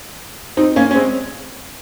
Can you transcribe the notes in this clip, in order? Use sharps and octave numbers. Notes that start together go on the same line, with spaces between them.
C4 D#4
A#3 C#4
C#4
G#3 C4